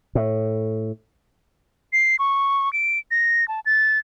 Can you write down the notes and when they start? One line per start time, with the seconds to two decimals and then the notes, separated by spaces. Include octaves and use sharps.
0.15 A2
1.93 C7
2.19 C#6
2.73 D7
3.11 A#6
3.48 A5
3.66 A6